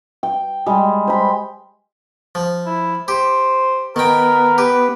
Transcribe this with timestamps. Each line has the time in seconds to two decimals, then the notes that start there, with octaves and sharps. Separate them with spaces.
0.23 G5
0.66 G3 G#3
1.07 C5 B5
2.35 F3
2.66 E4
3.08 G4 C5
3.96 D#3 B3 A#4 G5
4.58 G4 B4